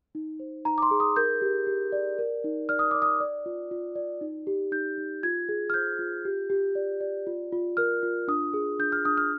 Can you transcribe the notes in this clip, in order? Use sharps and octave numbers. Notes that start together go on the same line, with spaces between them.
D#4
C5
D#4 A#5
D6
C6
G#4
D#6
A#4 G6
G4
G4
D5
A#4
D#4
D5 F6
D#6
D5 D6
D#6
D5
F4
F4
D5
D#4
G4
D#4 G6
D#4
F4 G#6
G#4
F6
C5 G6
F4
G4
G4
D5
D5
F4
F4
A#4 F6
F4
D4 D#6
G#4
D4 G6
F6
D4 D#6
F6